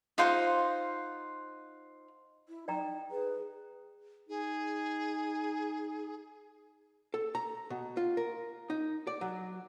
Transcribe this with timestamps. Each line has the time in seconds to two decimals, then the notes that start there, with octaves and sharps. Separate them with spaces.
0.18 D#4 F4 C5 F#5
2.49 E4
2.68 D#4 D5 G5 A#5
3.11 G#4 B4
4.29 D#4 G#4
7.14 A4
7.35 A#5
7.70 B2
7.97 F4
8.17 A#4
8.70 D#4
9.07 D5
9.21 F#3